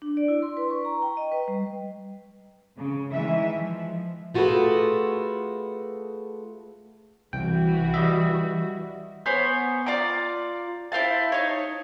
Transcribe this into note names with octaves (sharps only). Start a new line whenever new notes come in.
D4
D5
E4
C6
B4
C#6
A#5
G5
D#5
B4
G3
C#3
D#3 E3 G#3 E5
F3
A3 F4 F#4 G#4 A4 B4
C2 E3 F#4 G5
G3 D#5 E5
B3 C5 C#5 G#5
F4 D5 A#5 D6
E4 C5 F5 A5
D#4 C#5